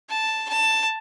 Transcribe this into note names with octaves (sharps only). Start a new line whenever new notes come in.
A5
A5